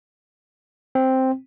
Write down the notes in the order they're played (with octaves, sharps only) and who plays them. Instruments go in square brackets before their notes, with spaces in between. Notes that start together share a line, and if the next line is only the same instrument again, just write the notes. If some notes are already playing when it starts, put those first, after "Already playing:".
[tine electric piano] C4